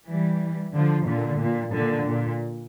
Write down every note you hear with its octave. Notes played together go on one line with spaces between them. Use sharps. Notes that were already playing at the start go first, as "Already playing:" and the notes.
E3 G3
D3 F3
A#2 D3
A#2
A#2 D3
A#2